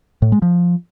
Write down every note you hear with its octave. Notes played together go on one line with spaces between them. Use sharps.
A2
G#3
F3